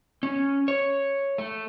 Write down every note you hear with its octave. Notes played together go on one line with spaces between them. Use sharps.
C#4
C#5
A3